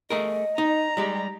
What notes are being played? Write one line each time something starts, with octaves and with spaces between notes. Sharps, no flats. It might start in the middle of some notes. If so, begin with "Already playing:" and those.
A3 G#4 A#4 D#5
D#4 A#5
G3 G#3 G4